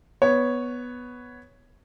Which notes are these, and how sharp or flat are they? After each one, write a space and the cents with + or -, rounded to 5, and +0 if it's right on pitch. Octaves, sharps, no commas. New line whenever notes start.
B3 +0 C#5 +0